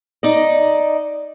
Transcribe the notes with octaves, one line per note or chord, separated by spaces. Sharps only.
D#4 D5 D#5